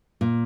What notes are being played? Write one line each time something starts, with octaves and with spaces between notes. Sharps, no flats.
A#2